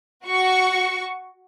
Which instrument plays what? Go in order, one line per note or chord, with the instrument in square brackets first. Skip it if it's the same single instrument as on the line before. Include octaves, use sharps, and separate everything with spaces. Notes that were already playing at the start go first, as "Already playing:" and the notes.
[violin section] F#4 C#6